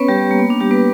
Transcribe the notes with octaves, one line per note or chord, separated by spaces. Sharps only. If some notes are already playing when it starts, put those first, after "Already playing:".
Already playing: B3 C#4 B4 C#5
G3 G4
A#3
B3
D4
G3 G4
B3 B4